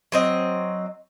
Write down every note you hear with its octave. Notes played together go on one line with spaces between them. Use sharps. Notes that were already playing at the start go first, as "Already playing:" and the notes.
F#3 C4 D#5